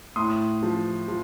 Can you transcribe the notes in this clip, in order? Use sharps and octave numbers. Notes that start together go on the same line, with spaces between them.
A2 C6 D#6
F3
F3